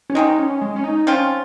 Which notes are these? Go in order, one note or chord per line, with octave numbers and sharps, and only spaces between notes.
C#4
C3 D#3 G#3 D#4
C#4
G#3
C#4
D#4
F3 C4 C#4 F4